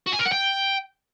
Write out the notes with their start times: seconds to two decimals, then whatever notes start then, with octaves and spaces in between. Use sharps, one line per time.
0.06 F#4
0.13 G#5
0.19 A#4
0.25 F#5
0.32 G5